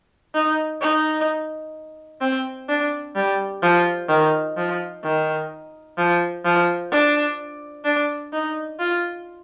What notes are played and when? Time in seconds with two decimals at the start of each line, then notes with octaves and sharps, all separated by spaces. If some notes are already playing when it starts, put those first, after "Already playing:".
0.35 D#4
0.81 D#4
2.21 C4
2.69 D4
3.16 G3
3.63 F3
4.09 D#3
4.57 F3
5.04 D#3
5.98 F3
6.45 F3
6.92 D4
7.85 D4
8.33 D#4
8.79 F4